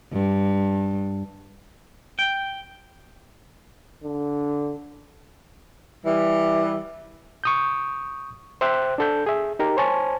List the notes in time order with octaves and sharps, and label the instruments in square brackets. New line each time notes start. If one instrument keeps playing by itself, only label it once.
[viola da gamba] G2
[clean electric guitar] G5
[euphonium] D3
[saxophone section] E3 G3
[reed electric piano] C#6 D#6 G6
C5 E5 G5 F#6
D4 A4 G6
G#4 E5
D#4 G4 A#4
C5 C#5 G#5 A5